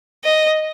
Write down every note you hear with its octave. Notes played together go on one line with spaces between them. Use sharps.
D#5